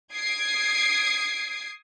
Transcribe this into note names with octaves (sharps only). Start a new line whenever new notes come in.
D#6 G#6 C7 D7